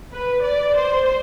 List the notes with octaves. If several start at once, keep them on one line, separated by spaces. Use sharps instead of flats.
B4
D5
C5